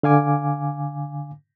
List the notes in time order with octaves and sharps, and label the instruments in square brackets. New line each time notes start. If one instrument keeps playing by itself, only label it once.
[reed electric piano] D3 F5 G#5 D6